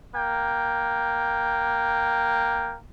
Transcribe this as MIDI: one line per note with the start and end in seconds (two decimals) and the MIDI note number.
0.15 2.75 58
0.15 2.75 79